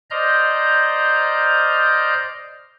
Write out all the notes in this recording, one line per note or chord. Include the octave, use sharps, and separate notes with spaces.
C5 D5 D#5 A#5 F6 G6